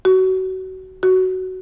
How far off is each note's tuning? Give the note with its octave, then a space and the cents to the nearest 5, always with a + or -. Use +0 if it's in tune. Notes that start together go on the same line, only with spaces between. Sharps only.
F#4 +25
F#4 +10